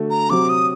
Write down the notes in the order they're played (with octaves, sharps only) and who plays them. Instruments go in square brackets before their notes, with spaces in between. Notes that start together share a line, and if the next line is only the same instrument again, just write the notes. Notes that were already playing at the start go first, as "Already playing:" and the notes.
Already playing: [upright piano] D3 A3 F#4
[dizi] A#5
[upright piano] C3 F#3 C4 [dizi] D6
[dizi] D#6